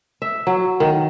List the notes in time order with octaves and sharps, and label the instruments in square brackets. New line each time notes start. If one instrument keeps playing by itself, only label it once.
[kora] E5
F#3
D#3